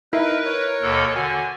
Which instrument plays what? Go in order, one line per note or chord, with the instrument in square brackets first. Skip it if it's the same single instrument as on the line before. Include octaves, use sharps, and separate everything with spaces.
[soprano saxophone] D#4 [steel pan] E4 [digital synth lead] A#4 [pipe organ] B4
[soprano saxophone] C#5
[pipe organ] D#2 B2 A4
[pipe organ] D3 [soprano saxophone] F#4 [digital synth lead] G#5